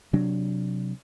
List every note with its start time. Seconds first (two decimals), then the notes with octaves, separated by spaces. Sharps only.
0.13 C3 F#3 D4